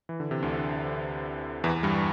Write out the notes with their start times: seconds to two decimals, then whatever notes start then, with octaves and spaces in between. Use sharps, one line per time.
0.09 E3
0.20 D3
0.31 C3
0.42 D2 D3
1.64 E2 E3
1.83 G2 G3